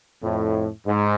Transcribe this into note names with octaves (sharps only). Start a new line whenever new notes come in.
F2 A2
G#2